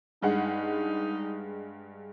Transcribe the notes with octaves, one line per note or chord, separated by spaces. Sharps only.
G2 G#3 D#4 F#5